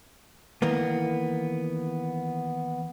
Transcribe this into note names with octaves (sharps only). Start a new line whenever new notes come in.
D#3 E3 A#3 B3